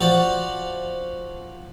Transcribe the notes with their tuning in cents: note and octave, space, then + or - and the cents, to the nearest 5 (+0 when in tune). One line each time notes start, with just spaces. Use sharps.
F3 +0 F#4 +0 D5 +0